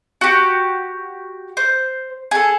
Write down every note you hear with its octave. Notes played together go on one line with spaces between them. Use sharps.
F#4 G4
C5
G#4 A4